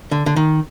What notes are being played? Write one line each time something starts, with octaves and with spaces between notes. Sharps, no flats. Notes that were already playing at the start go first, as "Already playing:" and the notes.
D3
D3
D#3